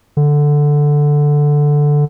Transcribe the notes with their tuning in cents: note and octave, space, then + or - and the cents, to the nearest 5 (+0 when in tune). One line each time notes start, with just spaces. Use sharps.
D3 +0